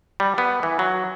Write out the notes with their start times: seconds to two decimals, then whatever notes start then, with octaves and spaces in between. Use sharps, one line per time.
0.20 G3
0.38 B3
0.63 E3
0.79 F#3